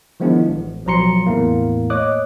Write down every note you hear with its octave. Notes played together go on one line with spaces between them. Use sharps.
D#3 F3 G#3 B3 D4 E4
A1
B1 F3 F#3 A#5 C6 C#7
E2 A2 A3 A#3
C#5 D#5 D6 D#6 F#6